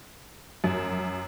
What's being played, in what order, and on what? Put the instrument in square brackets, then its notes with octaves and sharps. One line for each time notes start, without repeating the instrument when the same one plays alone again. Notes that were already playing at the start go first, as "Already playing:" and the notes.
[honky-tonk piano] F#2